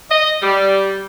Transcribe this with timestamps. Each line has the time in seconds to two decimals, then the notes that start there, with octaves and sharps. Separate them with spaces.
0.11 D#5
0.42 G3